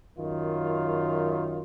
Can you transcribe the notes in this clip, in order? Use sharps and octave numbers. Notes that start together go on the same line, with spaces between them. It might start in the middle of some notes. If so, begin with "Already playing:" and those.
F#2 D#3 F4